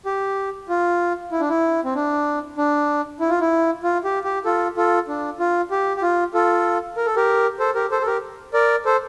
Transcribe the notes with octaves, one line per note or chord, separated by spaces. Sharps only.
G4
F4
E4
D4
E4
C4
D4
D4
E4
F4
E4
F4
G4
G4
F4 A4
F4 A4
D4
F4
G4
G4
F4
F4 A4
A#4
A4
G4 A#4
A4 C5
G4 A#4
A4 C5
A4
G4 A#4
A#4 D5
A4 C5